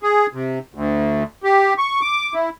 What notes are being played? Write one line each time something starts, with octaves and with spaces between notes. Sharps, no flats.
G#4
C3
D2
G4
C#6
D6
E4